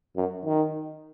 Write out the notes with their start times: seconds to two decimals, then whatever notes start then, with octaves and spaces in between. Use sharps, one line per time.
0.17 F#2
0.45 D#3